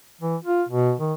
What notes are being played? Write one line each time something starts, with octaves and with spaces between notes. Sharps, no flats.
E3
F4
B2
D#3